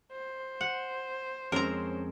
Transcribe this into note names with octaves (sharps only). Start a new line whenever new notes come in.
C5
F#5
F2 G#3 C4 C#4 A#4 A#5